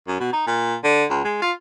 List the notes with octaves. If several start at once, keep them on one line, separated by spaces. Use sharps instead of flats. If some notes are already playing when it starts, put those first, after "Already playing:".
F#2
B2
D#4
A#2
D3
C#2
G#3
F4